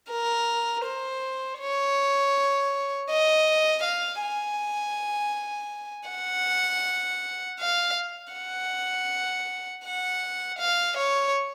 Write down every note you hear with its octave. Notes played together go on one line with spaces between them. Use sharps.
A#4
C5
C#5
D#5
F5
G#5
F#5
F5
F#5
F#5
F5
C#5